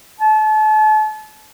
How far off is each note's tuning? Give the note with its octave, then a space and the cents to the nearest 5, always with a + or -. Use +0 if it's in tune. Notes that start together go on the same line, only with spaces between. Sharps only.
A5 -35